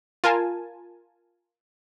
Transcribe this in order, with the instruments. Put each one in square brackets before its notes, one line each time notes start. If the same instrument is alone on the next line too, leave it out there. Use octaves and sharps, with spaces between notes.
[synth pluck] F4 A#4 G#5 A5